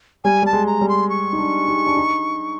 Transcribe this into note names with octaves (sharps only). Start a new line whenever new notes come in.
G3 G#5
G3 A5
G#3
A#5
G3
C6
C#6
D#4
D4
D#4
D4
D#4